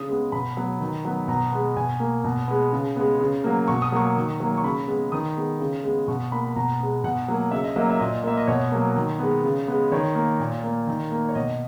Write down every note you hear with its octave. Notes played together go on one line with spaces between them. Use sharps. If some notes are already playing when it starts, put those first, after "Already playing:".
Already playing: C#3 D#6
G#3 B3
B2 B5
F#3 B3
D#3
F#3 B3
B2 A#5
G#3 B3
B2 G#5
A#3
B2
G#3 B3
C#3
G#3 B3
C#3
F#3 A#3
B2 C#6
D#6
F#3 A#3 C#6
D#3
F#3 A#3
C#6
C#3 B5
G#3 B3
D#3 D#6
G#3 B3
C#3
G#3 B3
B2 C#6
A#3 B5
B5
B2 A#5
G#3 B3
B2 F#5
F#3 A#3
C#3 E5
D#5
F#3 A#3 E5
E5
A#2 D#5
A#3 E5
D#5
B2 C#5
F#3 A#3
D#3
G#3 B3
C#3
G#3 B3
D#3 C#5
A#3
A#2
A#3
D#3
A#3
C#5
B2 D#5